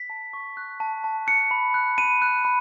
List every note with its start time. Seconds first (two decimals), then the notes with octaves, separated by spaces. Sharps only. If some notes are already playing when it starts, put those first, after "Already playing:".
Already playing: B6
0.10 A5
0.33 C#6
0.57 F#6
0.80 A5
1.04 A5
1.27 F#6 C#7
1.51 B5
1.74 F#6
1.98 B5 D#7
2.22 F#6
2.45 B5